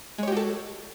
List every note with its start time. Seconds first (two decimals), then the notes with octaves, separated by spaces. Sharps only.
0.18 G#3
0.23 C#5
0.28 G4
0.32 F#4
0.37 A4